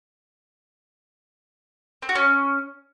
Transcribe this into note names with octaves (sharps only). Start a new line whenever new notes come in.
C4
F#4
C#4